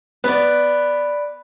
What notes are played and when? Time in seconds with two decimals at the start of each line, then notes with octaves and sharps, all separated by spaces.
0.24 B3 B4 D5